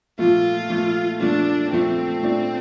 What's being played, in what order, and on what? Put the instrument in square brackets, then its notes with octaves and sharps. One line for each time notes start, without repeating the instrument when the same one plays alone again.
[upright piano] A#2 F3 A3 [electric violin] F4
[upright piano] A#2 F3 A3
[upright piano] A#2 F3 A3 [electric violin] D4
[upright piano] A#2 F3 A3 [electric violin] C4
[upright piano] A#2 A3 D4